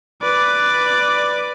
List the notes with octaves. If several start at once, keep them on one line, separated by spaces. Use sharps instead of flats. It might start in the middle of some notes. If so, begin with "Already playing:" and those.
B4 D5